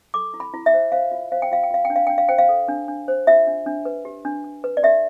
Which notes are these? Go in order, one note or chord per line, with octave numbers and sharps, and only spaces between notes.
A4 D6
E4
B5
E4
E5
C5
C5 F5
F4
C5 F5
G5
F4 F5
G5
F4 F5
G5
D4
F5
D4 G5
F5
C5 G5
F5
A4
D4
D4
C5
F4 E5
D4
D4
B4
G4
D4
D4
B4
D5
G4 E5